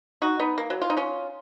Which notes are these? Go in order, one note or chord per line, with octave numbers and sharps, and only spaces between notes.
D#4 F#4
B3 D#4
A#3
F#3
F4
D#4
C#4 F4